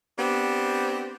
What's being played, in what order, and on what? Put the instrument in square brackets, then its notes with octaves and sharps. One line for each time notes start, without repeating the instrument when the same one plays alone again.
[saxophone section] B3 C4 D4 G4